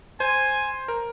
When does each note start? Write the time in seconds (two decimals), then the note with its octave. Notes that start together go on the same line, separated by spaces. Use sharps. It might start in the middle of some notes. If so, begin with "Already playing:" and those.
0.20 C5 G#5
0.88 A#4